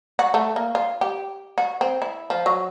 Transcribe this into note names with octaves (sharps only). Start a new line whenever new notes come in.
F#4
A3
A#3
F4
G4
F#4
C4
E4
F3
F#3